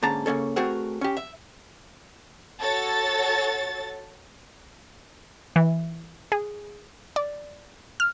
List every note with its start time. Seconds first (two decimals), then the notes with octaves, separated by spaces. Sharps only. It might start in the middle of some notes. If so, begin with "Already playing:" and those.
0.03 G#2 D3 A#3 C#4 A5 A#5
0.26 C#3 A#3 C#4 A4
0.56 A3 C4 F#4 G#4 A#4
1.01 C#4 G4
1.17 E5
2.61 F#4 A4 C#5 A6
5.56 E3
6.32 G#4
7.16 D5
8.00 F6